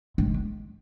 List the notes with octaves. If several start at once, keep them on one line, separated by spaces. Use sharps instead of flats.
G#3